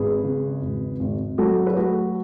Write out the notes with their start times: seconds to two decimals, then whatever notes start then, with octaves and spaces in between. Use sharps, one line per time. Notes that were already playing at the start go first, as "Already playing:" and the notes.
Already playing: G#1 G#4 B4
0.24 C#3
0.62 G#1
1.00 G#1
1.38 F#3 F#4 A4
1.66 B4
1.77 A3 F#4 A4